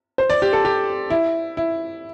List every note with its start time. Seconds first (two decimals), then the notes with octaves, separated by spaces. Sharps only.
0.18 C5
0.30 D5
0.42 G4
0.53 A4
0.65 G4
1.10 E4
1.57 E4